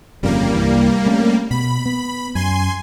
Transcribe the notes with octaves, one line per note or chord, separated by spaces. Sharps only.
G1 F2 C#3 G3 A#3
C2 G2 E3
A3 C4 C#4
B2 B5
B3
F#2 G#5 C6